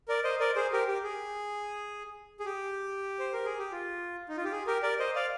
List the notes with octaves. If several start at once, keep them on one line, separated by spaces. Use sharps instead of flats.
A#4 D5
C5 D#5
A#4 D5
G#4 C5
G4 A#4
G4
G#4
G#4
G4
C5
A#4
G#4
G4
F4
D#4
F4
G4
G#4
G4 A#4
A#4 D5
C5 D#5
D5 F5